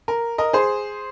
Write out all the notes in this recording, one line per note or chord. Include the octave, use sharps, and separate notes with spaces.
A#4
A#4 D#5
G#4 C5